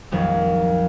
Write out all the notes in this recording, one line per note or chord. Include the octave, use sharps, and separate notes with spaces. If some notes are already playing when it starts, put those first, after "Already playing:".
A#1 F2 D#3 F#3 G3